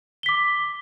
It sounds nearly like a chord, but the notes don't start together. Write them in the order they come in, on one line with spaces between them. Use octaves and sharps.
G7 B6 D6